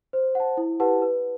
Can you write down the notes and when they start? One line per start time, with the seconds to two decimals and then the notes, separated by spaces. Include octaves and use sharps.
0.13 C5
0.35 F#5 A5
0.57 E4
0.80 G4 B4 F#5 A5
1.02 B4